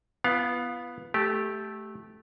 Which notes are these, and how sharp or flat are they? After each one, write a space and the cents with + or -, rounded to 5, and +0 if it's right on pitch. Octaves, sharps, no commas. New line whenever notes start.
B3 +0 F4 -45 F5 +25
A3 -15 G4 +0